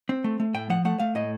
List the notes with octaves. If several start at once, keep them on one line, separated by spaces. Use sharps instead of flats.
C4
A3
A3
A2 G5
F3 F#5
A3 F#5
A3 F5
A2 D#5